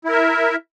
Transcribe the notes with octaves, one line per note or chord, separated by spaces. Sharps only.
E4 A#4 E5